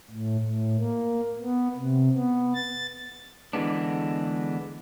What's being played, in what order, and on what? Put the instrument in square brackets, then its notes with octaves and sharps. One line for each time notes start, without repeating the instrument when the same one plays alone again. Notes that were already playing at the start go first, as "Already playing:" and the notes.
[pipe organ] A2
A2
A#3
B3
C3
B3
A6
[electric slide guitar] D3 E3 F3 G#3 B3 D4